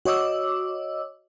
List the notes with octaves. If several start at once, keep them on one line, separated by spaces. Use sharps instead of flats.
F#4 C#5 D#5 D6 E6